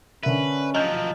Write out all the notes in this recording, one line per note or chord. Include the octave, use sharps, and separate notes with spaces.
D3 C#4 A#4 B4 E5
F3 F#3 D#5 F6 G6